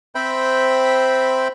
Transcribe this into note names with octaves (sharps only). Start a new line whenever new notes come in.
C4 C5 E5 G5 B5